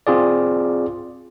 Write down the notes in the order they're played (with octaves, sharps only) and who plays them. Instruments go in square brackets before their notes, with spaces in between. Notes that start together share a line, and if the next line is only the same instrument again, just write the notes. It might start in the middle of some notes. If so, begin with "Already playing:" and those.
[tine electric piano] C4 F4 G#4 D5